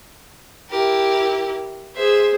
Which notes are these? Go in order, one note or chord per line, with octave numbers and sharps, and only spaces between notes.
E4 G4 A#4
G#4 C5 E5 C6